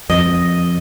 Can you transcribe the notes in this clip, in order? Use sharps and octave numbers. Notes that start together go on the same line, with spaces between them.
F2 D#5